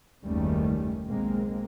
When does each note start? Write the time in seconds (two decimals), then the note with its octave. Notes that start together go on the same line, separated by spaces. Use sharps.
0.24 F#1 D#2 D#3 G3 A3 C#4
1.07 B1 G#3 A#3 C4